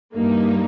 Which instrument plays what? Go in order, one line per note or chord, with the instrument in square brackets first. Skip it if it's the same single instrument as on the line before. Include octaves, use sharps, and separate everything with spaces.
[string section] G2 G3 A#3 D#4